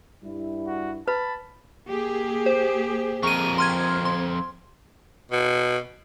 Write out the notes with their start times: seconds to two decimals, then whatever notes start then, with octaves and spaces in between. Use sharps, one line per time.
0.24 G2 G3 E4
0.67 F#4
1.08 B4 A5 B5
1.88 A#3 G4 G#4
2.46 C5
3.23 F2 A#4 C#6 D#7
3.58 C4 C6 F6 G#6
4.05 C6
5.31 B2